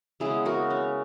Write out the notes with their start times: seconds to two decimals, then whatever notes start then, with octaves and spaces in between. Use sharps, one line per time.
0.20 C#3 G#3 B3 E4 G#4
0.45 F#4 A#4
0.70 C#4